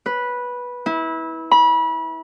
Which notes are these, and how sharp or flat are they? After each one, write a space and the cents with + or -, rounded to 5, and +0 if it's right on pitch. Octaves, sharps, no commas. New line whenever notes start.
B4 -10
E4 -25
B5 -30